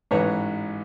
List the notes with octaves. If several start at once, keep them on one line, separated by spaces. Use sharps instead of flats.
A1 G#2 B4 C#5 A#5